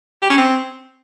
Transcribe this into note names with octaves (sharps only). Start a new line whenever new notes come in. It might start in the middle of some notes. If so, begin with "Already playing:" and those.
G4
C#4
C4